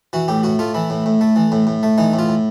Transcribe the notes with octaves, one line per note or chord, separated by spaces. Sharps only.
E3 F#4
A2 G4
A2 F#4
A3 F4
E3 E4
A2
A2
A3
E3
A2
A2
A3
E3 D#4
A2
F4
A2